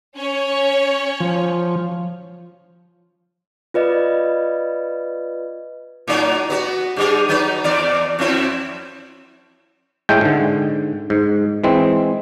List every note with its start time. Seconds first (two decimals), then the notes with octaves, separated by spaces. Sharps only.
0.15 C#4 C#5
1.20 F3
3.74 F4 B4 D5 D#5
6.08 A2 F#3 D#4
6.50 B3 F#4
6.96 G2 G3 G#4
7.29 F#3 D#4 B4
7.64 E2 D5
8.19 F2 C4 E4
10.09 A2 G#3 A3 G5
10.21 G#2 D3
11.10 G#2
11.64 E3 G#3 C4